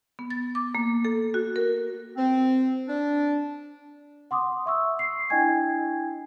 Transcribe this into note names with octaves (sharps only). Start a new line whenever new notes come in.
B3
A6
D6
A#3
A4
F#4
A#4
C4
D4
F#5 C6 D6 D#6
E5 C#6 E6
C7
D4 E4 D#5 G5 G#5 G#6